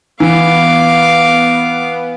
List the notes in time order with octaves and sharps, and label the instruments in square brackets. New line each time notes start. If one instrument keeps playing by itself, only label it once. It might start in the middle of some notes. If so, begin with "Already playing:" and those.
[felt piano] E3 [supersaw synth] B3 [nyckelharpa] F5 D6